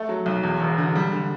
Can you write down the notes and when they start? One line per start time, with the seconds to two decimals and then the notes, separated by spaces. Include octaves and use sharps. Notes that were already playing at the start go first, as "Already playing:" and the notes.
Already playing: A3
0.09 F#3
0.26 B1
0.43 E2
0.60 E1
0.78 D3
0.95 G3
1.12 D3